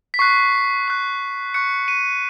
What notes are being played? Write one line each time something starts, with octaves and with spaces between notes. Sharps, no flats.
B6
C#6 F#6 C7
C#6 F#6
C#6 F#6 C#7
D#7